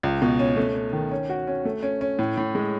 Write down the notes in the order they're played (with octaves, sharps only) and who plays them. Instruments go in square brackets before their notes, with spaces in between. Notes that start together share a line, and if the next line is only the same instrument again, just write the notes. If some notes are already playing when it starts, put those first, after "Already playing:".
[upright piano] C#2
B2
C#4
A3
C#4
D#3
C#4
F#4
C#4
A3
C#4
C#4
A2
A2
G#3